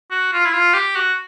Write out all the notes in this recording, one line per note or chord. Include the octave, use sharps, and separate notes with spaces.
F#4
F4
E4
F4
G4
F#4